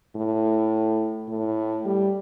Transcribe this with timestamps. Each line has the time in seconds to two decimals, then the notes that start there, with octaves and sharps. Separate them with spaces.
0.16 A2
1.29 A2
1.85 G3